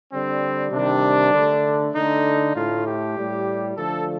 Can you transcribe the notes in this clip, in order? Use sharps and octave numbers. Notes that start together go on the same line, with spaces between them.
D3 G3 C4
C3 D#3 G3 D4
D3 A3
D3 A3 D#4
A2 A3 F4
G4
A2 G3
D3 F3 A3 A4